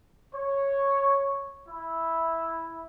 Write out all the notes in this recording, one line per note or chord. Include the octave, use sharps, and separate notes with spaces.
C#5
E4